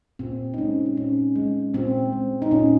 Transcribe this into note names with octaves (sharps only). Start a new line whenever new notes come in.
A#2 C4
D#4
G#3 C#4
C4
A#2 C#4
G#3
A#2 C4
G#3
D#4
A#2 C#4